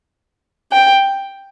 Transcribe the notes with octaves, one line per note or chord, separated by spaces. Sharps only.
G5